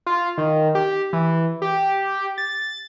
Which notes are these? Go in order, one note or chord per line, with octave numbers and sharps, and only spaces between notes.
F4
D#3
G4
E3
G4
A6